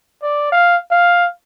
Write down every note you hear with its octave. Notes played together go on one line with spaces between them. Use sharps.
D5
F5
F5